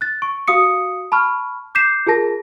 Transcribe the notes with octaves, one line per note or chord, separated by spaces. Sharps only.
F#6 A6
C#6 D7
F#4 F5 D#6 C#7
A5 B5 C#6 F6
D6 G6 B6 C7 E7
F4 G#4 A#4 A5 A#6